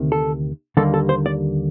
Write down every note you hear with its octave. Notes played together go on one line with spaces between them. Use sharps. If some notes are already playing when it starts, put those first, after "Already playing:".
Already playing: D2 C3 D#3
A4
D#2 D3 G3 A#3 A4
A4
C5
D5